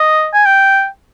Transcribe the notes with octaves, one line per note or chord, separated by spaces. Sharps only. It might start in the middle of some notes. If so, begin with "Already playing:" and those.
Already playing: D#5
G#5
G5